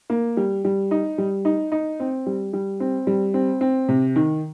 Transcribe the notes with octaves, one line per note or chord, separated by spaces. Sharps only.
A#3
G3
G3
D#4
G3
D#4
D#4
C4
G3
G3
C4
G3
C4
C4
C3
D#3